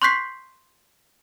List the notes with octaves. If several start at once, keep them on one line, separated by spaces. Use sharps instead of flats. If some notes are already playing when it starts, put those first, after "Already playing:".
C6 C#6 F#6 G6 B6 C7